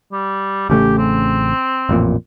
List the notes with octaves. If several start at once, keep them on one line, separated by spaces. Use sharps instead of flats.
G3
A1 C#3 A3 G4
C4
A1 F2 A#2